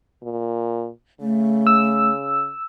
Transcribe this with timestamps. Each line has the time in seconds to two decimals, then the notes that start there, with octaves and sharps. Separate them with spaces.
0.23 A#2
1.21 C#3 A3
1.67 E6